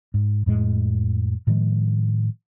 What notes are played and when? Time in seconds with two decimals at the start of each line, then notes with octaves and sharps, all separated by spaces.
0.14 G#2
0.46 F2 A2 G#3
1.47 A2 D#3 F3 G#3